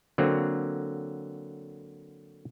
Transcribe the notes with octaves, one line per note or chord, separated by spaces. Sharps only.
D3 F#3 A#3 C4